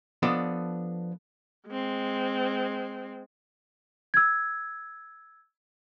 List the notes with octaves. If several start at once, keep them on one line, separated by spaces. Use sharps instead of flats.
F3 B3 D4 A4 D5 D#5
G#3 C4
E6 G#6